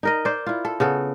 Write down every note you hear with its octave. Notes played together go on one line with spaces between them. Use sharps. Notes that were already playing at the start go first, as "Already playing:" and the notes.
D#4 A#4 D#5
C5 D5
E4 F4
A4
C#3 B3 A4